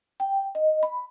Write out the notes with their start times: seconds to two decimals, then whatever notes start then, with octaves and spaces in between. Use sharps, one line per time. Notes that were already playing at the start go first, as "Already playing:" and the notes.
0.20 G5
0.55 D#5
0.83 B5